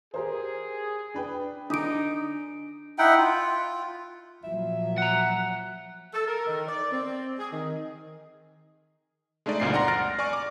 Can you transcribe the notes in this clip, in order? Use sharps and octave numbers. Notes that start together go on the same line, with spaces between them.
G4 G#4 A#4 C5
D4 B4 G5
D3 D4 D#4 D6 D#6 D7
D#4 E4 F#5 G5
F4
A#2 F3 F#3 E5
F#5 A#5 F#6
A4
A#4
D#3
D5
C4
G#4
D#3
G#3 A3 D4 D#4 D5
G1 C#2 F#2 A#2 C4 C7
D5 F#5 A#5 C6 A#6
F6 A6 A#6 D7
D5 G#5 C#6 F6
D6